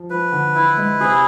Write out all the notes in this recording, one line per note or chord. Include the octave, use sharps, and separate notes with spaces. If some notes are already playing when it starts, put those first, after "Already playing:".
Already playing: F3
F3 B4
D3
E3 E4
G#3
C3 G#4